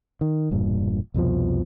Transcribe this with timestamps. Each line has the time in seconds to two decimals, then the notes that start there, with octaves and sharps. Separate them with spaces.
0.21 D#3
0.51 E1 G2 A#2
1.14 C2 F2 B2 F3